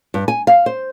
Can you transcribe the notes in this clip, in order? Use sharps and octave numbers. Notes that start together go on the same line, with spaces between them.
G2
G#5
F5
C5